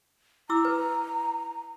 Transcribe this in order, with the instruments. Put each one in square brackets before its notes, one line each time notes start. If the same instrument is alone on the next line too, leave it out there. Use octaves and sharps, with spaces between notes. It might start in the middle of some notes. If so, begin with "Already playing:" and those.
[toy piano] E4 D6 E6 [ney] A#5
[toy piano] B4